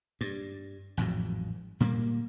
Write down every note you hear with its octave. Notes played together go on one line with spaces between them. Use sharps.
G2
A1 F2 G#2 F#3
A#2 G3 G#3 A#3